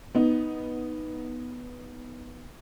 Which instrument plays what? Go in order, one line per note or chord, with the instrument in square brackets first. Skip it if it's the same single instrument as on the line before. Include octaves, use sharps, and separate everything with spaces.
[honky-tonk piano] B3 D#4